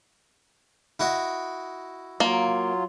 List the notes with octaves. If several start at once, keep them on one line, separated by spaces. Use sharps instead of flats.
E4 F#4 D#5
F#3 A#3 F4